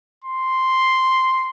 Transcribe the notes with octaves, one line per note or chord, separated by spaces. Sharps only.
C6